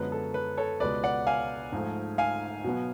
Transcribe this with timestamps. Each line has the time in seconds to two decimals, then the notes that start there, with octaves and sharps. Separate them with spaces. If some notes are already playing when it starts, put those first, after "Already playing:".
Already playing: F#2 D3 F3 G#3 B3 B4
0.12 A4
0.34 B4
0.57 A4 C#5
0.80 C#2 B2 G#3 B4 D5
1.03 D5 F#5
1.27 F5 G#5
1.72 G#2 F3 A3
2.18 F5 G#5
2.64 B2 F#3 B3